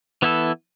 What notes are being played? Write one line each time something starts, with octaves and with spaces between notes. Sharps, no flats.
E3 B3 E4 A4